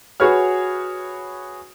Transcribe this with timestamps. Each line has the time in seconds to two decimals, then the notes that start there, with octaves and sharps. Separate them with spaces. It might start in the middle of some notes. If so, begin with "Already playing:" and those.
0.20 F#4 G#4 B4 C#5 F6